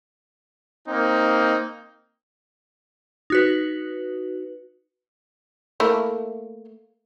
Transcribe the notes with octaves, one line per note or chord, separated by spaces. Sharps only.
A#3 C4 D#4
D#4 F#4 B4
A3 A#3 E4